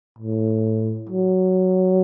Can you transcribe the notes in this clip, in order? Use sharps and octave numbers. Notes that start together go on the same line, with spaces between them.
A2
F#3